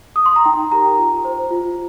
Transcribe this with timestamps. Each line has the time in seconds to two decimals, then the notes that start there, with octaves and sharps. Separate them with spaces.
0.16 D#6
0.26 C6
0.36 A#5
0.45 D#4 G5
0.72 G4 A#4 A#5
0.98 F4 A#5
1.25 C5
1.50 F4